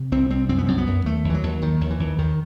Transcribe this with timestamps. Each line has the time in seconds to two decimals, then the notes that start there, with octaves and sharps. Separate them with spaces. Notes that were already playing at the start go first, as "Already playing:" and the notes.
Already playing: C3
0.12 C2 C4
0.30 C2 C4
0.49 F#2 C4
0.58 B3
0.66 F#2 C4
0.78 B3
0.87 F#2
1.06 D#2 A3
1.24 D#2
1.30 E3
1.34 F#3
1.43 D#2
1.62 D#2 D#3
1.81 D#2
1.90 E3
1.99 D#2
2.18 D#2 D#3